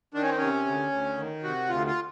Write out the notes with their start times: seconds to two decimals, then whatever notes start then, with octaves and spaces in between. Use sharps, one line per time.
0.14 D#3 D4
0.22 C#4
0.29 C4
0.38 C3 C#4
0.66 D2
0.92 D2
1.18 D#3
1.43 C3 F#4
1.69 D2 F4
1.87 F4